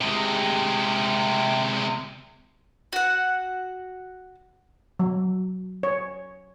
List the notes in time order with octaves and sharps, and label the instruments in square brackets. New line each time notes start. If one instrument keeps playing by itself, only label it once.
[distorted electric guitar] C3 G#3
[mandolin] F#4 F#5
[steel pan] F#3
C#5